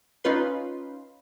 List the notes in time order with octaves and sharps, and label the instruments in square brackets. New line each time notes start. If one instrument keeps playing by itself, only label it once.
[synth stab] C#4 D#4 F4 B4 C6